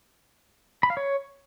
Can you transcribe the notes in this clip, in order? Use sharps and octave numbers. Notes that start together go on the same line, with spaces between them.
B5
F5
C#5